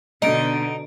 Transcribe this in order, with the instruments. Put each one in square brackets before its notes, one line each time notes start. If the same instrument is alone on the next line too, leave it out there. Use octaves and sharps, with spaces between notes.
[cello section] B2 D3 [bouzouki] D#4 [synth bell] D#5 D7